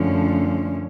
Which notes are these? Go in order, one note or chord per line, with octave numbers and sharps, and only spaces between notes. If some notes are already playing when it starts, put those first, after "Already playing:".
Already playing: F#2 D3 F3 A3 C#4